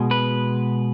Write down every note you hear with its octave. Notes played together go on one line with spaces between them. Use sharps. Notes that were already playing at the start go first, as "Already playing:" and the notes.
Already playing: B2 G#3
B4